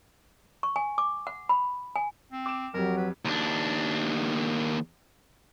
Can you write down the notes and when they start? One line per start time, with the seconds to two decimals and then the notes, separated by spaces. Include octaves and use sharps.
0.63 C#6
0.76 G#5
0.98 D6
1.27 F#5
1.49 B5
1.96 G#5
2.32 C4
2.46 D6 E7
2.74 F2 F#3 G4 A#4
2.97 B4
3.25 D#2 D4